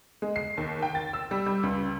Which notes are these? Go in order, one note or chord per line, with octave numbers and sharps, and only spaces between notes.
G#3
C7
D#2
G5
A6
E6
G3
G3
C#2